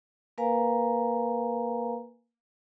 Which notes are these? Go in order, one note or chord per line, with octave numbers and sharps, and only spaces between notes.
A#3 A#4 B4 F5 G#5 A#5